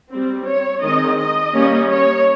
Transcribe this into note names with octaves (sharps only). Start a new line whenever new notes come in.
G3 C4
C#5
D#3 G#3 C4 D#5
D#5
G3 A#3 C#4
C#5